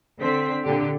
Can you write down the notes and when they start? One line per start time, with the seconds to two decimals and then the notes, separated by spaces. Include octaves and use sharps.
0.19 D3 C4 B6
0.64 A#2 D3 G4